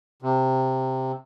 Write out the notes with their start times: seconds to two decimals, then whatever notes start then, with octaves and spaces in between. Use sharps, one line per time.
0.22 C3